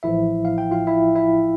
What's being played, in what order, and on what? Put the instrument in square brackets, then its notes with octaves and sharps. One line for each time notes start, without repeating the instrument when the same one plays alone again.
[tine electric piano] A1 A2 F3 E4 E5
F5
G5
F4 F5
E4 E5
E4 E5